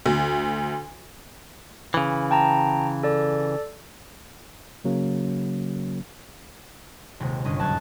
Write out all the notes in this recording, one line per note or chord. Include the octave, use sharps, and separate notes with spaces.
D2
C#3 E3
G5 A5 A#5
A4 D5
C#3 F#3 A#3 C#4
D#1 C3 G#3
G1 C#4 D#5
F#1 A5 F#6 G#6